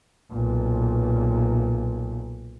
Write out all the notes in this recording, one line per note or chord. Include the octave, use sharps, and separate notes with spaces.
B1 A#2